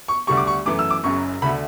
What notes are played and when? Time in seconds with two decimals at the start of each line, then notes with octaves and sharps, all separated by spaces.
0.08 C#6
0.27 D2 D3 G3 C#6
0.37 D6
0.47 C#6
0.65 F#2 E3 A3 D6
0.79 E6
0.90 D6
1.03 F#1 F#2 C#3 F#3 C#6
1.42 D2 D3 A3 B5